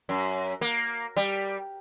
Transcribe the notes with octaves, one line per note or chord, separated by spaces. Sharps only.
F#2
A#3
G3